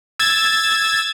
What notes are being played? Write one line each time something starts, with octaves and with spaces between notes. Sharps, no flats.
E6 G#6 A6